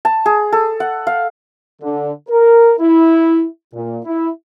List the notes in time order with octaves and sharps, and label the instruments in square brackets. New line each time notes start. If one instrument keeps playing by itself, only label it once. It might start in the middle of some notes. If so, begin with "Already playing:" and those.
[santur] A5
G#4
A4
F#5
F5
[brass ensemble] D3
A#4
E4
A#2
E4